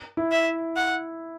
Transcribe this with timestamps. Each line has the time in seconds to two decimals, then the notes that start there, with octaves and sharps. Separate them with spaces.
0.17 E4
0.32 E5
0.76 F#5